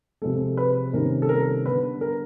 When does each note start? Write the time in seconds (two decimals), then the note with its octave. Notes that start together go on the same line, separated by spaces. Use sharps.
0.22 C3 F3 G#3 A4
0.57 B4
0.93 C3 D#3 G3 A#3 C#4 A#4
1.22 A4
1.29 A#4
1.66 D3 G3 B3 B4
2.01 A#4